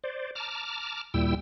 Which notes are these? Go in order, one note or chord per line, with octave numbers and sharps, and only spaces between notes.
C5 D5
A5 A#5 D6 F6
D#2 A#2 G3 E4 G5 E6